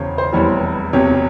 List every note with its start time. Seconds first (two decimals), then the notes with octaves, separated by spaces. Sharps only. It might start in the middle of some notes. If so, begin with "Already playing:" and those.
Already playing: E1 E2 C#3 C5 C#5
0.18 C5
0.33 F1 E2 E3 G3 C#5
0.93 E1 E2 C3 C#5